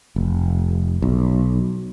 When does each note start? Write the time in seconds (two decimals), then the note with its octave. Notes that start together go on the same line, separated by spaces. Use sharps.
0.16 F1
1.02 B1